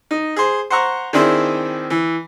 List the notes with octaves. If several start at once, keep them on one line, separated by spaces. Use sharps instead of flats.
D#4
G#4 C5
C5 F#5 A#5 C#6
D#3 C4 D4 E4 G#4 C5
E3